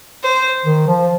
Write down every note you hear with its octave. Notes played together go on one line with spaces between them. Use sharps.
C5
D#3
F3